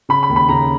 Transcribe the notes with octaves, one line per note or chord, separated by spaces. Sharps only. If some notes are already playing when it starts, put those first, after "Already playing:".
C#3 B5
B5
D#2
B5
C#3 A#5